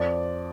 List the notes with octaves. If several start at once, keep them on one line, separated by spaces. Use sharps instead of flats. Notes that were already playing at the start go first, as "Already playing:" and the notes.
Already playing: F2 D5